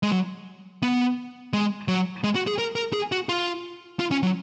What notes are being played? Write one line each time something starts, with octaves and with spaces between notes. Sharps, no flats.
G#3
F#3
B3
G#3
F#3
G#3
F#4
G#4
A#4
A#4
G#4
F#4
F4
F4
C#4
F#3